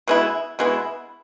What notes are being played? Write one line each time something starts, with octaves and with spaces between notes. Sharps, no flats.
B2 G#3 B3 E4
B2 G#3 B3 E4